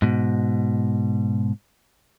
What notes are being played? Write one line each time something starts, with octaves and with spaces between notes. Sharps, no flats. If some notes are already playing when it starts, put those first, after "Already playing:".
G#2 B2